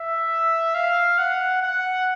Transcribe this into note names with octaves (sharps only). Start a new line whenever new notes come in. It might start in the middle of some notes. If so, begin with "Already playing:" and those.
Already playing: E5
F5
F#5
F#5